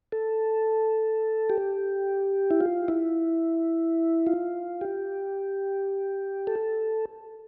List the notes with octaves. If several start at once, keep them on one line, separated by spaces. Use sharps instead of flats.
A4
G4
E4
F4
E4
F4
G4
A4